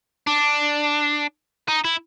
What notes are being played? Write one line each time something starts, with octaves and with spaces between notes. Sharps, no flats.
D4
D#4
E4